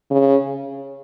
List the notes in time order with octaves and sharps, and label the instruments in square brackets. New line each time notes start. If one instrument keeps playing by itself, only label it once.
[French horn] C#3